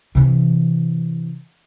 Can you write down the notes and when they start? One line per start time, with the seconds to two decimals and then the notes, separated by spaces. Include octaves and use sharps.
0.15 C3 E3